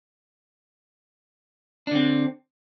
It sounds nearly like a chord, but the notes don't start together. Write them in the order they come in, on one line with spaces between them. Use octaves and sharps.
D4 D3 C4